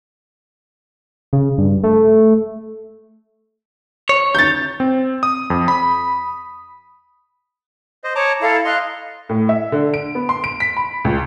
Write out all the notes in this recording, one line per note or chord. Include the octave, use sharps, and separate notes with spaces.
C#3
G2
A3
C#5
G6 A6
C4
D#6
F2
B5
C5 D#5
C#5 A5 A#5 D6
E4 A4 F5 A#5
D#5 F5 C6 F#6
A2
E5
D3
D7
B3
C6
D7
B6
B5
C#2